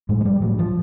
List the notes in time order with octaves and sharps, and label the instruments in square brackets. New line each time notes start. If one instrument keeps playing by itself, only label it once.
[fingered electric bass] A2 G#3
G#3
G3
A2 F#3
F3